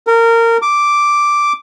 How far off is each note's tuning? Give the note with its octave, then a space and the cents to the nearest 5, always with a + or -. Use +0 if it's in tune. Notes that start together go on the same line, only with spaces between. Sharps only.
A#4 -20
D6 +0